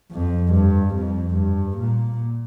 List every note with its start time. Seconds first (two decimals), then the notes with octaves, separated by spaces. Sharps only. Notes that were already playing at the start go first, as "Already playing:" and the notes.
0.12 F2
0.53 G2
0.95 F2
1.36 G2
1.78 A#2